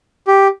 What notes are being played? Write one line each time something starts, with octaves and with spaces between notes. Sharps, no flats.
G4